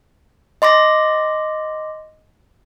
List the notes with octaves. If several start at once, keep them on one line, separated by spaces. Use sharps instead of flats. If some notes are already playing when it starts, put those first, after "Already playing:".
D#5 C6 D6 A#6